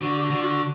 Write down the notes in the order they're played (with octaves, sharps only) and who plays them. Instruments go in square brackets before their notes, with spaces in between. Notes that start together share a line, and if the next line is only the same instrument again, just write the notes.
[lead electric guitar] D3 [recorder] F#4
[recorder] G4
F#4
[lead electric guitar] D3
[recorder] F4
F#4